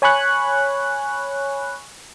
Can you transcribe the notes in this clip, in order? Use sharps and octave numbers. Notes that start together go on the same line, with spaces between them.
C#5 G#5 B5 C#6 F#6